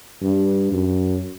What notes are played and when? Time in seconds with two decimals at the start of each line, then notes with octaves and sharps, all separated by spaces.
0.22 G2
0.72 F#2